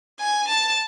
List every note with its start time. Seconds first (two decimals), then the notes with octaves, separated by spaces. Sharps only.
0.19 G#5
0.48 A5